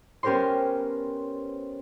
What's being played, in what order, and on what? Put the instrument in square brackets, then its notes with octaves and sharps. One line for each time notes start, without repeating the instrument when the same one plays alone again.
[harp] B3 C#4 G4 A#4 C5 C6